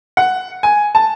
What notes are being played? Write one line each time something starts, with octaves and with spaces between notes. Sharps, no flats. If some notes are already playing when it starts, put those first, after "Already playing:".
F#5
G#5
A5